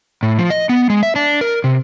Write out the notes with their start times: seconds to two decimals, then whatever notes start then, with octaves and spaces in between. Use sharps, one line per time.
0.23 A2
0.38 F3
0.50 D#5
0.69 B3
0.90 G#3
1.03 E5
1.16 D4
1.41 A#4
1.64 C3